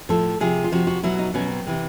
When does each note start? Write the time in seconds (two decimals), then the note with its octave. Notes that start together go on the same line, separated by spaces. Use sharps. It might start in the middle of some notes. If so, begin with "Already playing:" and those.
0.09 A2 F3 A4
0.40 C3 F3 G#4
0.64 F4
0.72 C3 F3 F#4
0.87 F#4
1.03 B2 F#3 E4
1.19 D#4
1.34 B2 F#3 C#4
1.51 C4
1.67 C3 E3